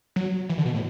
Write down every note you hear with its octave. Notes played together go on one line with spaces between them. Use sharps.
F#3
E3
D3
B2
A2